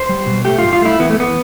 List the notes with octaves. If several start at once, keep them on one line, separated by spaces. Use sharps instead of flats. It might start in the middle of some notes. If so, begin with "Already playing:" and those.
Already playing: C5
G3
B2
A3 G4
G2 F4
F4
A3 E4
E3 B3
A3
E3 B3